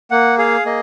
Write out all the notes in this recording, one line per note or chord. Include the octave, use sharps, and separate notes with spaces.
A#3 F#5
G#4 F5
A#3 D#5